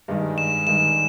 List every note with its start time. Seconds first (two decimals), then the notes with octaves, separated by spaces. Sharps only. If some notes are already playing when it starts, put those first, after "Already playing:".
0.08 G2 D#3 G#3
0.38 E7
0.67 G2 D#3 G#3 E7